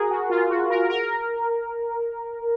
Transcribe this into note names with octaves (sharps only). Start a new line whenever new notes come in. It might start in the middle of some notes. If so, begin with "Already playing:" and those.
Already playing: F#4 G#4 A#4
F#4
F4
F#4
A#4
A#4